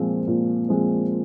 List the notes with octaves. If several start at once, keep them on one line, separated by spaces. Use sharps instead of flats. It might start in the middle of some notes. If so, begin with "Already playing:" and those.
Already playing: A#2 F3 G#3 C4
A#2
F3 G#3 C4